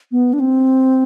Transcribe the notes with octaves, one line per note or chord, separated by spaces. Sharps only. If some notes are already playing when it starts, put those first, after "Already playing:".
B3
D4
C4